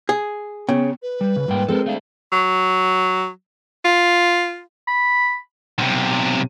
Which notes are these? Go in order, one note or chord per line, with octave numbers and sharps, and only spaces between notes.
G#4
C#3 B3
B4
G3
C#3
G#2 G3 A#3 G5
G#3 C4 A4 A#4
A3 D4 F5
F#3
F4
B5
B1 C3